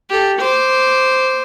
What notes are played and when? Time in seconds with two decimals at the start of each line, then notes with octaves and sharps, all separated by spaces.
0.10 G4 A4
0.39 C5 D6